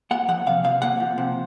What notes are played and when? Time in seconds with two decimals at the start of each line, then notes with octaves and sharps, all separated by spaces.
0.11 A#3 F#5
0.28 F3 F#5
0.47 C3 F5
0.64 C3 F5
0.82 A#3 F#5
1.00 F3
1.18 C3